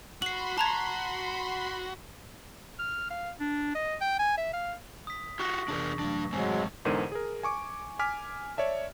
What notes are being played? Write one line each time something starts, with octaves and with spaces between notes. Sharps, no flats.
F#4 B5 C6 C7 F#7
F#4 A5 A#5 G#6
F6
F5
D4
D#5
G5
G#5
E5
F5
D#6 B6
F4 F#4 C#6 A#6
F2 C3 E3 D4 G#4 A#4
G2 C3 F#3 A3 D4
G#2 F#3 G#3 C4 G#5
E2 G#2 D3 A#4 C5 D#7
G#4 A#4
G#5 C#6 D6
G#5 D6 F6 B6
C#5 D5 E5 A5